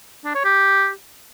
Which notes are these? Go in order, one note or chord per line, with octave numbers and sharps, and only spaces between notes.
D4
C#5
G4